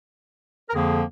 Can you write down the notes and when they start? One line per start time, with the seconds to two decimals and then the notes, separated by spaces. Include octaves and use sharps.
0.69 A#4
0.74 F2 D3 F3 A#3 G#4